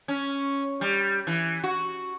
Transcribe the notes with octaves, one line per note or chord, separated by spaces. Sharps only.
C#4
G3
E3
F#4